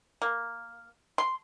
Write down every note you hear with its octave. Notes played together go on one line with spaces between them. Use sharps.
A#3
C6